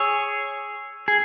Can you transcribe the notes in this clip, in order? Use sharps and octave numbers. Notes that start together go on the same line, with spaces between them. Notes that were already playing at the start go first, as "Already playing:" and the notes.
Already playing: G#4 C#5 E6
G#4